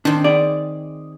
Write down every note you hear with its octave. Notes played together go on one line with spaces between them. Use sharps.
D#3 C4 D4
G#4 D5